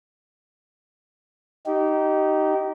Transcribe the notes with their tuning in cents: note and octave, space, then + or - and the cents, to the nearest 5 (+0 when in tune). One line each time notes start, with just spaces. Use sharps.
D#4 +0 G4 -25